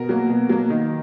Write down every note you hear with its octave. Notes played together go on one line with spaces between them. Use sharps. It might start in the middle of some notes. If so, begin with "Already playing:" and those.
Already playing: B2 A#4
F#3 A#3
B2
F#3 A#3
D#3